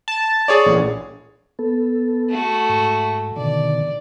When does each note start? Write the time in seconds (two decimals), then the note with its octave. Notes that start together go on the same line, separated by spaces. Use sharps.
0.08 A5
0.48 G#4 C#5 D5
0.66 A#1
1.59 B3 A4
2.30 A3 F#4
2.69 G#2
3.36 B2 D3 D#3 D5